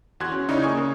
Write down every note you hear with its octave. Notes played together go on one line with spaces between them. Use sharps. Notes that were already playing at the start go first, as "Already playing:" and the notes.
E2 F#4 C6 F#6 G#6
C#4
C#3 D#4 E4 C#5 D5
A#3 G#5 C#6 D#6 G#6
C#3